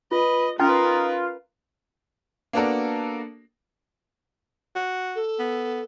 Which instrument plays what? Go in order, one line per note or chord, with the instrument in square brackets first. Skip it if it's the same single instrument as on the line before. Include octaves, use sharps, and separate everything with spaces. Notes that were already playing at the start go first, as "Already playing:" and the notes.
[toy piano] F4 [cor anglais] B4 [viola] D#5
[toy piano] C#4 G5 [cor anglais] D#4 [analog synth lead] F4 [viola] A#4 B4
[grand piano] A#3 B3 D4 F#4 A4 A#4
[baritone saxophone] F#4
[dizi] A4
[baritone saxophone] B3